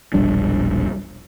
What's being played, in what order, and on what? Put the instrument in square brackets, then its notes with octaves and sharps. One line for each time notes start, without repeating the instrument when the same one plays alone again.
[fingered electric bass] E1 A#1 G3 D4